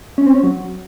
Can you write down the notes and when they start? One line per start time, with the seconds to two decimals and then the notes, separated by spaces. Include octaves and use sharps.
0.18 C#4
0.26 C4
0.35 C#4
0.43 F#3